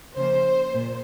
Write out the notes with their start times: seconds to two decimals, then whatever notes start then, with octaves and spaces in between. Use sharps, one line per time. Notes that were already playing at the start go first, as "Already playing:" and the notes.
0.16 C#3 F3 A#3 C5
0.74 A#2